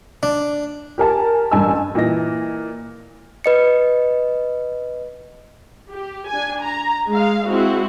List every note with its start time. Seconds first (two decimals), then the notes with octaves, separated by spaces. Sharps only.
0.23 D4
0.98 G4 A#4 G#5 A5
1.51 A1 G2 G#5 A5 E6
1.95 A#2 E3 D#5 A#6
3.44 B4 D#5 C#7
5.90 G4
6.29 D4 G#5
6.63 A#5
7.10 G#3 F5
7.47 G#3 C4 E4 F#4